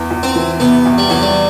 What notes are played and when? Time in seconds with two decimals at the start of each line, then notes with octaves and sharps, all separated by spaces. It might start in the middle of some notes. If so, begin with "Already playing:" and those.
Already playing: E2
0.11 E2
0.23 C4
0.35 E3
0.60 C3 B3
0.86 E2
0.98 G3
1.10 E2 F#3
1.22 G3